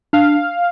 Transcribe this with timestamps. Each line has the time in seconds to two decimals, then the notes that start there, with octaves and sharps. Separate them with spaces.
0.13 D4 F5